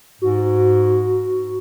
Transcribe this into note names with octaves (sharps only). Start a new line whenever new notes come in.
G#2 F#4